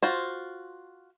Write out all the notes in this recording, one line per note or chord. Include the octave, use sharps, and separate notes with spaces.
F4 F#4 C5